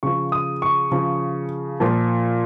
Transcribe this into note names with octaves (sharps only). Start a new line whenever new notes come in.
C#3 F3 C#6
D#6
C#6
C#3 F3
A#2 F3